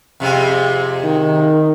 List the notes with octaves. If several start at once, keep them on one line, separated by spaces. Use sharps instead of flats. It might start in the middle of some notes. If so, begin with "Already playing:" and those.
F2 C3 G#3
D#3